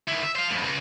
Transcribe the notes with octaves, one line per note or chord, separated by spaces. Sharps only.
D#3 E4
E5
C5 F5
F2 A2
C#2